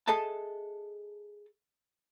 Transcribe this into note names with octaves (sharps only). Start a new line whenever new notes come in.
G#4 A4 D#5 E5 A5